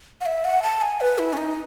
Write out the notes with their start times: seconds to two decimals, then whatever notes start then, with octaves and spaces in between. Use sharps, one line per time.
0.21 F#5
0.26 E5
0.45 F#5
0.63 A5
0.82 G#5
1.01 B4
1.18 E4
1.33 C#4
1.37 D#4